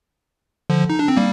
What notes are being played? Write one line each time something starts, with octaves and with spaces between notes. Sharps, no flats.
D3 F3
D#4
D4
C4
G3 A#3